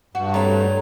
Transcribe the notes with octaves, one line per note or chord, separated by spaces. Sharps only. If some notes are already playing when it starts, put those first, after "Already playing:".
G2 F#4
A3 C4 E4 C#5 A#5